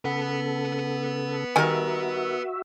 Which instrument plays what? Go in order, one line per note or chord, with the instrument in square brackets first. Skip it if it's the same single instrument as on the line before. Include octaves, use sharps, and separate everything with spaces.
[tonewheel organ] C#3 A4 [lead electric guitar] B4 F#5
[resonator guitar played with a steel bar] D#3 A#4 [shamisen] G3 D#5 G#5 [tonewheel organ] F#4 E5